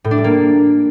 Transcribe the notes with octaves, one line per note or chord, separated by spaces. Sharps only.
A2
D4
G3
A#3